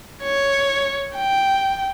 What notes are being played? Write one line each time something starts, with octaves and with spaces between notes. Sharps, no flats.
C#5
G5